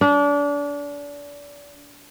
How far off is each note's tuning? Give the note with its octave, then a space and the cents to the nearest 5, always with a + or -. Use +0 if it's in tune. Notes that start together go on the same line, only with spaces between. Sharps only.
D4 -30